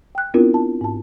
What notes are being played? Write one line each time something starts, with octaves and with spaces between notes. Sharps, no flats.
G5 F#6
B3 C4 D4 E4 F4 A#4
A5
G#2 A5